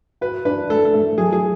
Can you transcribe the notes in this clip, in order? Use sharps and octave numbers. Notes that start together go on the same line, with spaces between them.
F#4 B4
D4 B4
A3 A4
A4
A3
F#3 G#4
G#4